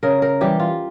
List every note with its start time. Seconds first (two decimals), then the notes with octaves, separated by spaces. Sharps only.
0.03 C#3 A#4
0.22 A#4
0.41 E3 G3 G4
0.60 F4